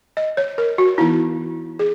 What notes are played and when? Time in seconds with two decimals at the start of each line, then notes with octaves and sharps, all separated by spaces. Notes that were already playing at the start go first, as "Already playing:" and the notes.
0.17 D#5
0.37 C#5
0.58 A#4
0.78 F#4
0.98 E3 B3 D#4 E4
1.79 G#4